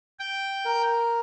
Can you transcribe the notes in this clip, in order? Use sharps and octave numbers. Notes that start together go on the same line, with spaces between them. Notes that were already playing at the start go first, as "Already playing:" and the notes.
G5
A#4